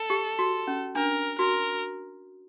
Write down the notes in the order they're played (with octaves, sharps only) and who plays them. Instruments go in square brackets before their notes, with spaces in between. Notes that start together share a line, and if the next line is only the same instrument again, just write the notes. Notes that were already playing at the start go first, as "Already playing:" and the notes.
Already playing: [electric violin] A4
[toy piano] G4
F#4
C#4
[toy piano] D4 [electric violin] A#4
[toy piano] F#4 [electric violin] A#4